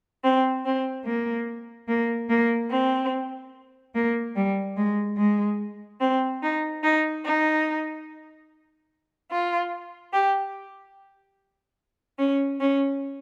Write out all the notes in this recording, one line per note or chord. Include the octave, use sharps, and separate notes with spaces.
C4
C4
A#3
A#3
A#3
C4
A#3
G3
G#3
G#3
C4
D#4
D#4
D#4
F4
G4
C#4
C#4